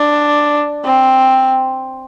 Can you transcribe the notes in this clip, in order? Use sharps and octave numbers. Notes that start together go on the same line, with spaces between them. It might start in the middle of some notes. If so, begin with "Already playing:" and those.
Already playing: D4
C4